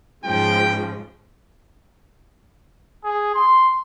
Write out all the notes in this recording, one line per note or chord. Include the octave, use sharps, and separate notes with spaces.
G#2 C#3 F3 G5
G#4
C6